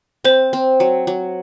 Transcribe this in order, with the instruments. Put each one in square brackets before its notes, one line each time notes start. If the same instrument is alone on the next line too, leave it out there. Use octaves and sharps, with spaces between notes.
[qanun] C4 [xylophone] C5
[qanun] C4
F#3
F#3